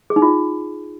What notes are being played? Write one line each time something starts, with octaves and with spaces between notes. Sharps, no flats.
G#4
D#4
F4